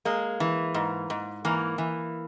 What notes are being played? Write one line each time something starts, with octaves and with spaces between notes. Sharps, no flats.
G#3 A#3
E3
G#2
G#2
E3 A#3
E3